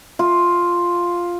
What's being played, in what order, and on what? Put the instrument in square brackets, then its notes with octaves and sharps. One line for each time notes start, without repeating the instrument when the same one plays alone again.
[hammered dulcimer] F4